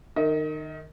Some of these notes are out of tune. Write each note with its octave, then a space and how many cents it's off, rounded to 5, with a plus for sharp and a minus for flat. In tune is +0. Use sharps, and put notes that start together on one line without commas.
D#3 -25 D#5 +35